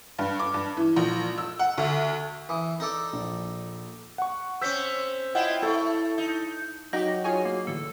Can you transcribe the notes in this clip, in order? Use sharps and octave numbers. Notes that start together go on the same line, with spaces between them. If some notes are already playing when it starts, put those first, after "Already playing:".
G2
D6
G2
E3
A#1
E6
F#5
D2
E3 D#6
D#4 A4 D5
A#1
F#5 C#6
C4 C#4 E6 G6 B6
E4 F4 D#5 F#5 G5
A3 E4 A4
D#4
F#3 D#4 F#4 G4 G5 A#6
F4 G#4 C#5 G#5
A#3
A1 D3 A4